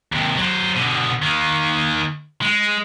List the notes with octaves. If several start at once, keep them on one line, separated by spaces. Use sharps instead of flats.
D#2 C3
F#3 C5
B2 D3
D#3 A#3
G#3